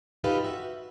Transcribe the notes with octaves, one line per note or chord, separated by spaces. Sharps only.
D#4 F4 G4 A4 B4 F5
F#4 E5